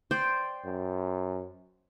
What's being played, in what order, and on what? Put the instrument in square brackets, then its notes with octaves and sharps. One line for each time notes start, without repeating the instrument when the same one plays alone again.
[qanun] C5 D5 G5
[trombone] F#2